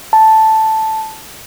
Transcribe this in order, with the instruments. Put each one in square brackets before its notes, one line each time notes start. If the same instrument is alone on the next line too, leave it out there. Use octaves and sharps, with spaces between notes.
[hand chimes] A5